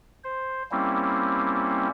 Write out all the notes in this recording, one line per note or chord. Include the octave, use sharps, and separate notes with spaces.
C5
G3 A#3 C4 C#4 E4